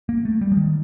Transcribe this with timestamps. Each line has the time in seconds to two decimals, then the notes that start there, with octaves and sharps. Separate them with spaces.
0.09 A#3
0.25 A3
0.41 G3
0.52 F3
0.57 D#3